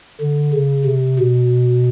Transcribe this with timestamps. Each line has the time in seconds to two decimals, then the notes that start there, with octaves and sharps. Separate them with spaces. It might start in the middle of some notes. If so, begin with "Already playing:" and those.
0.20 D3
0.53 C#3
0.86 C3
1.19 B2